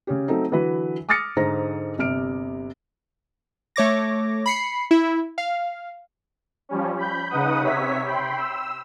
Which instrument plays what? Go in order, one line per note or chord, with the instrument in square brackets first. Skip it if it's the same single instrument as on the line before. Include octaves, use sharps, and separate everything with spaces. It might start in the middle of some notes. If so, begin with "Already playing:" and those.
[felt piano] C#3 C#4 G4
F#3 A3 C4 D#4
D3 E3 F#3 F#4 B4
D6 D#6 F6 A6 A#6 C#7
G#2 D3 G#4 C5 A#5 A#6
G1 C3 F6 D7
[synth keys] A3 C#5 D6 A#6
B5 C7 C#7
E4
F5
[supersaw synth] F3 G3 C#4
B5 G6
C#3 D#4 B4 F#5 D#6
C3 C#5 E5 B6
G5 B5 C6
E6